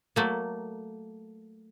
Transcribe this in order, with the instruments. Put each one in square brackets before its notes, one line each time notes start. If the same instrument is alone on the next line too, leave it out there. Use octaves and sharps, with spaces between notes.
[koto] F#3 A3 A#3